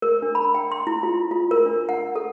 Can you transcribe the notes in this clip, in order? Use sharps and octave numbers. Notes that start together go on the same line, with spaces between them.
A#4
D4
B5
G5
C6
E4
F4
F4
A#4
D4
F#5
A4